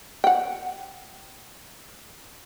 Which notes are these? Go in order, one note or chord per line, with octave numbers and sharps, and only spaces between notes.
F#5 G5